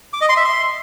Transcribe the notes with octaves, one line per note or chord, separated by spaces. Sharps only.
D6
D#5
C6
E5
C6